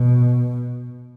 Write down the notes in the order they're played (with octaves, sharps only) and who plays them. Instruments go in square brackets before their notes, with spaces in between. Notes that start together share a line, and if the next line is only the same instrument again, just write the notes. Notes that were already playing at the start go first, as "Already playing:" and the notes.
Already playing: [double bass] B2